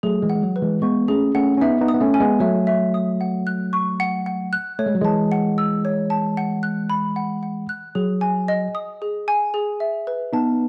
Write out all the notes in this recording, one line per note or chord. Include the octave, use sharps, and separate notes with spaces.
F#3 A3 G#4
E3 G#3
F#5
G#3
F#3
B4
E3 G#3
G#3 B3 C#6
A3 C#4 G#4
A3 C#4 F#5
C#4
B3 D#4 E5
B3 D#4
D#6
B3
A3 C#4
G#5
G#3 B3
F#3 A3 E5
E5
D#6
F#5
F#6
C#6
F#5
F#5
F#6
A3 C#5
G#3
F#3
E3 G#3 A5
F#5
E6
C#5
A5
F#5
F#6
B5
F#5
F#5
F#6
F#3 G#4
G#5
D#5
D#6
G#4
G#5
G#4
E5
B4
B3 D#4 A5